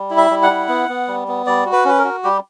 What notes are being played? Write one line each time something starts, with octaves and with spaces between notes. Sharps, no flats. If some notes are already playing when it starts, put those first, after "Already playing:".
Already playing: G3
E4
E5
G3
F#5
E4
B3
B3
G3
B3
G3 D5
F#4
B4
C#4 B4
A#4
F#4
G3 G4